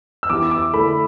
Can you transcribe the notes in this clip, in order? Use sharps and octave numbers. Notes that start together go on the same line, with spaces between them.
E6
E3 B3 E4 G4 D6
D6
D3 A3 E4 A4 B5